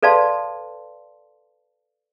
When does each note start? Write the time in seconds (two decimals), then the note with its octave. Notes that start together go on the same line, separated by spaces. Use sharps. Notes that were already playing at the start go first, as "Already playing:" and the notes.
0.03 A4 B4 D5 F5 A5 C6